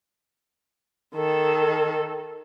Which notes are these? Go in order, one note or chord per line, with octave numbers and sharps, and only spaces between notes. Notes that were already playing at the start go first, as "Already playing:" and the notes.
D#3 A4